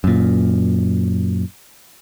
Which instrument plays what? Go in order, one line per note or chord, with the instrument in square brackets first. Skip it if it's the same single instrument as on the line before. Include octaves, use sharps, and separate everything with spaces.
[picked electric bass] F#2 A#2